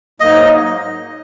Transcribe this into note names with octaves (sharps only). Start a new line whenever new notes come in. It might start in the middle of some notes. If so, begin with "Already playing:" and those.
G#2 F#3 A#3 D#4 D#5